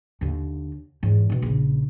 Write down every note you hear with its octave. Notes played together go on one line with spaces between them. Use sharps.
D#2 D3
E2 G#2
B2 D#3
A#1 C#3